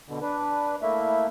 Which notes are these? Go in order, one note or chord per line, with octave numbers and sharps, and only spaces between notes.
B2 D3
D4 B4
A3 A#3 E4 E5